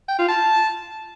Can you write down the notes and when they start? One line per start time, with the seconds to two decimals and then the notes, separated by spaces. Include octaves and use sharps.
0.09 G5
0.19 F4
0.29 A5